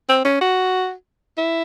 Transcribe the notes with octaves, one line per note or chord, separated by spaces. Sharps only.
C4
C#4
F#4
E4